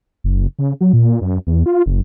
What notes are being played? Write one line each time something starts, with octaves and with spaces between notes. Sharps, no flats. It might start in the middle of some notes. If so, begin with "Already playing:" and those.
F#1
C#3
F#3
A#2
F#2
E2
F4
F#1